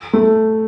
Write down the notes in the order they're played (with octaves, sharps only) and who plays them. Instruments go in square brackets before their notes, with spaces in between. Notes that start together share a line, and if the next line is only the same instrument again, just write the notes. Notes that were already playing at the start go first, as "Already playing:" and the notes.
[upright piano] A3